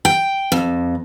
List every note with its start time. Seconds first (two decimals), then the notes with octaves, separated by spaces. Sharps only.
0.05 G5
0.52 F2